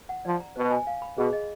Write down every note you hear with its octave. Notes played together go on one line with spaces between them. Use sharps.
F#5
F3 D5
A#5
B2 C5
G#5
F5
B5
B2 G#4
D#5